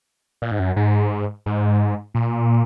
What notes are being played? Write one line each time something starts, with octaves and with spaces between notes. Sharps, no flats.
A#2
G#2
F#2
G#2
G#2
A#2